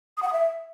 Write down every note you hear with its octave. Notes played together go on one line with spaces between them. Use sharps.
D#6
F#5
D#6
E5